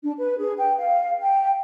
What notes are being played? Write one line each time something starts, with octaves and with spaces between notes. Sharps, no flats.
D4
B4
G#4
G5
F5
G5